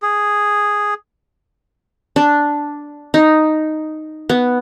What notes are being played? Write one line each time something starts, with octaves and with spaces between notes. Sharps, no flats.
G#4
D4
D#4
B3